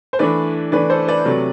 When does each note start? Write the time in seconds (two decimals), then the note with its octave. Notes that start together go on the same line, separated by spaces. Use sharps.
0.13 C5
0.19 E3 A3 D4 B4 D5
0.72 E3 A3 D4 B4 D5
0.90 A4 C5
1.08 B4 D5
1.25 C3 F#3 A3